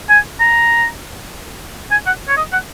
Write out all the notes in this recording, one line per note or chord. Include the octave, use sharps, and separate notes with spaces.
G#5
A#5
G#5
F#5
C#5
D#5
F#5